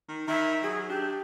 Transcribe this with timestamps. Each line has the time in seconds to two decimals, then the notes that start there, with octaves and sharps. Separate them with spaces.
0.08 D#3
0.28 D#3 E5
0.63 F#3 G#4
0.89 D4 G4